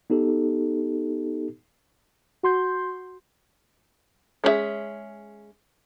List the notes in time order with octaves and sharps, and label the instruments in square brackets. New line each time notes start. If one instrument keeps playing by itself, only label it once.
[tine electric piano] B3 D#4 G4 A4
[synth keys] F#4 C6 G6
[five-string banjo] G#3 C#4 D4 G#4 E5